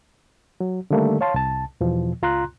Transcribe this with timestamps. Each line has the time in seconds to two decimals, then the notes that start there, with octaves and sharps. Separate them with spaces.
0.60 F#3
0.90 D3 D#3 G3 A3 A#3
1.21 C#5 F5 A5 C6
1.34 C2 A5
1.81 E2 B2 F3
2.22 C#2 F4 A#5 C6 F#6